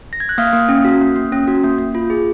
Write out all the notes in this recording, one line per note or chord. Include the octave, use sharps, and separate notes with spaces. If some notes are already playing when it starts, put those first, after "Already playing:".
A#6
G#6
F#6
A#3 F5 F6
A#3
C#4
F#4
A#3
A#3
C#4
F#4
A#3
A#3
F4
G#4